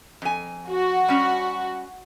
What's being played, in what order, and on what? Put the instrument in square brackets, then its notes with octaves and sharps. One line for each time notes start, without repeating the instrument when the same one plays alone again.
[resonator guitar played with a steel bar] F2 G#5
[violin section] F#4
[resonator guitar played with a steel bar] G3 C#4